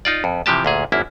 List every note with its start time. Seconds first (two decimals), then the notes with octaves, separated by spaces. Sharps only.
0.05 D#4 F4 D5
0.24 F2
0.46 C3 E3 F3 G4 A5
0.65 D2 A#2 G#4
0.92 G#1 F#2 A#3 E4